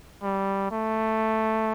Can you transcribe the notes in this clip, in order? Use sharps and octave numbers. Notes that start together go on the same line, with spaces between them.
G3
A3